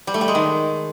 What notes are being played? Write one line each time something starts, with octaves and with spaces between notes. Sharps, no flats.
G3
A3
G3
G#3
D#3